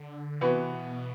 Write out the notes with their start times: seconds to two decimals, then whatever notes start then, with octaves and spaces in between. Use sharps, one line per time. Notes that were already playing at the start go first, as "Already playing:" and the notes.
Already playing: D3
0.41 C3 E3 B3 F#4
0.75 B2